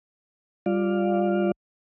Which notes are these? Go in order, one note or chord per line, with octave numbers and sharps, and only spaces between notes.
G3 F4 D5 F5